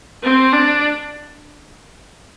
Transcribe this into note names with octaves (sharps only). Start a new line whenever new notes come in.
C4
D4